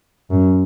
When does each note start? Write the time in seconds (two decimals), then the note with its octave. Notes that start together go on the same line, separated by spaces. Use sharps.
0.31 F#2